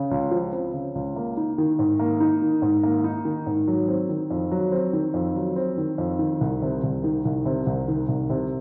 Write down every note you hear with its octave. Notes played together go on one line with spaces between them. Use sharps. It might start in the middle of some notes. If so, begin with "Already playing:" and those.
Already playing: C#3
C#2
F3
C4
C#3
C#2
A#3
D#4
D#3
G#2
A#3
D#4
D#3
G#2
A#3
D#4
D#3
G#2
F#3
C4
D#3
F2
F#3
C4
D#3
F2
F#3
C4
D#3
F2
D#3
C2
C3
C2
D#3
C2
C3
C2
D#3
C2
C3